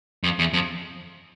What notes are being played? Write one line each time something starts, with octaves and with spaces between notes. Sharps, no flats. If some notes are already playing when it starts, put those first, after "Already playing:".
F2
E2
F2